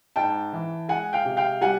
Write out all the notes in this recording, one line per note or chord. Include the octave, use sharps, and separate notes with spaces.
G#2 G5 A5
E3
G#3 F#5 G#5
F5 G5
C3
F5 G5
G3 F#5 G#5